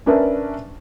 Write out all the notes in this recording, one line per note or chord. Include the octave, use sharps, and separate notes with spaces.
C#4 D4 A#4 B4 E5